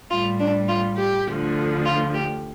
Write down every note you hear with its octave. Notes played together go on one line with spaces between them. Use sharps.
A2 G3 F4
D4
F4
G4
D2 D3 F3
F4
G4